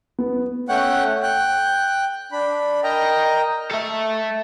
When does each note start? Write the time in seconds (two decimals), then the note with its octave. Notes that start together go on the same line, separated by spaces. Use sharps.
0.19 B3
0.69 A3 C#4 C#5 F#5 G5 F#6
1.23 G5 F#6
2.32 D4 B5
2.83 A#4 D#5 G5 A#5
3.71 A4 E5